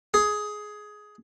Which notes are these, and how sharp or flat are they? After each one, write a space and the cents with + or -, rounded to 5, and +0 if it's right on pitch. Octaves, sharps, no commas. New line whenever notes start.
G#4 +10